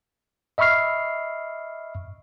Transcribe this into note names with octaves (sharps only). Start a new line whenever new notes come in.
D#5 E5 B5 C#6 F6 C7